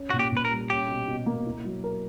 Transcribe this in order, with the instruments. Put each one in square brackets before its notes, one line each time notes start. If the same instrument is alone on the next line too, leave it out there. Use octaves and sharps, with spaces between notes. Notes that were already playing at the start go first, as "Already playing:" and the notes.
Already playing: [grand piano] C#4
[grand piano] A#2 [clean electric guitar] F#4
[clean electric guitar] G4
[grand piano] A#2 [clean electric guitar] B4
[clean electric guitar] A#4
[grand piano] G3
[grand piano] C#4 [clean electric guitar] G4
[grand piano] B2
B2
A#3
E4
F#3
A#4